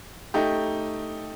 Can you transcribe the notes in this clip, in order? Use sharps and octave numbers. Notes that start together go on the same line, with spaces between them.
A3 D#4 G4